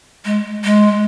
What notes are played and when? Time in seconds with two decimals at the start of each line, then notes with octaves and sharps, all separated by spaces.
0.25 G#3
0.64 G#3